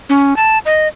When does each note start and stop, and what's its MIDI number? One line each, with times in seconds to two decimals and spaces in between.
0.09 0.36 61
0.37 0.58 81
0.66 0.88 75